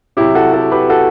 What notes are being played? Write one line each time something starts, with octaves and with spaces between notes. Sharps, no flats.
C3 F#3 E4 G4
F#4 A4
F#4 A4
G4 B4
F#4 A4